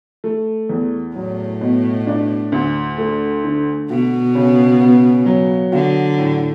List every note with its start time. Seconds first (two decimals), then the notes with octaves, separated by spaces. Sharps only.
0.24 A3
0.69 E2
1.15 A2 F#3
1.61 B2
2.07 D4
2.52 D2
2.98 A3
3.44 D3
3.89 B2 F#4
4.35 C#3
4.81 B3
5.26 F#3
5.72 D3 F#4
6.18 A2